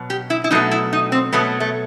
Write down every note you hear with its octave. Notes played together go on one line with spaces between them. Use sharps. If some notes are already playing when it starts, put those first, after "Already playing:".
Already playing: B2 F#3
G4
E4
E4
B2 F#3 A3 D#4
E4
D#4
C4
B2 F#3 A3 B3
A3